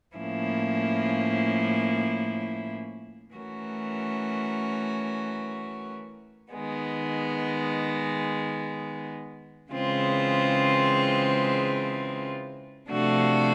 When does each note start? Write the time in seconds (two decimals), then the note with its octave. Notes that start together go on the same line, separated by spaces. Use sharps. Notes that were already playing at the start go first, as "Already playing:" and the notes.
0.16 A2 F3 A#3 C#4 E4
3.35 E3 A3 C#4 F#4 A#4
6.53 D#3 G#3 B3
9.71 C#3 E3 G#3 C4 F4
12.89 C3 F3 A3 D4 F#4